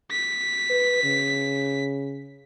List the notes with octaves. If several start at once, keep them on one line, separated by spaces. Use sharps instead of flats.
B6
B4
C#3